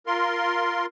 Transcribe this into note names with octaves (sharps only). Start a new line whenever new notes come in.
F4 A#4 C6